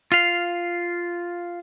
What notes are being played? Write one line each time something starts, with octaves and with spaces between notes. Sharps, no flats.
F4 F5